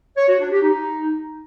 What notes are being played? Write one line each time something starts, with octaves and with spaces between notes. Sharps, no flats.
C#5
F#4
D4
G4
D#4